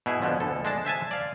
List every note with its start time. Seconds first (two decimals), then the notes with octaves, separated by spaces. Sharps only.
0.06 B2 E4 G#4
0.22 B2 D3 F3
0.40 D2 A4
0.65 G#3 D4 A5
0.85 C5 E5 G#5 A5
1.11 D5 F5